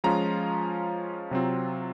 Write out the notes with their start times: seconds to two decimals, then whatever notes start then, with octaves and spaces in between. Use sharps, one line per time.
0.04 F3 G#3 C#4 F4 A#5
1.31 C3 F#3 C4 F4